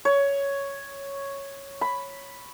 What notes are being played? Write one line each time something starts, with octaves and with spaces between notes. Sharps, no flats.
C#5
B5